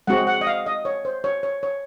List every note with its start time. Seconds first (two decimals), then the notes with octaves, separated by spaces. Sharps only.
0.07 G#3 C4 F#4 F#5
0.27 F#5
0.41 D#5
0.47 F5
0.66 D#5
0.85 C#5
1.05 C5
1.24 C#5
1.43 C#5
1.63 C#5